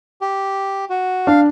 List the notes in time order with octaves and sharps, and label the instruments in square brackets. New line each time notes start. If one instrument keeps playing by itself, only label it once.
[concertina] G4
F#4
[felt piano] D4 [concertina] F5